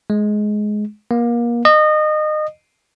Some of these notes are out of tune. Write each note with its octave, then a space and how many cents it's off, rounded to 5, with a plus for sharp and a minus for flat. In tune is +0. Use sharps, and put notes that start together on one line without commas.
G#3 +15
A#3 +30
D#5 -25